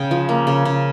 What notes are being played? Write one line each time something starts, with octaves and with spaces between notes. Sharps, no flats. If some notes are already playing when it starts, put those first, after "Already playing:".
Already playing: C#3 G5
F3
A#3
C#3
C#3